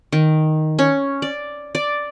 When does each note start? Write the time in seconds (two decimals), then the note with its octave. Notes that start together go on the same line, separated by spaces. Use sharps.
0.12 D#3
0.79 C#4
1.22 D5
1.75 D5